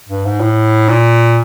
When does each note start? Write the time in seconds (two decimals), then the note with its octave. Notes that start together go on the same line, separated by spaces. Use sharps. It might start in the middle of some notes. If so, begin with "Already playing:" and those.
0.09 G2
0.25 G#2
0.41 A2
0.89 A#2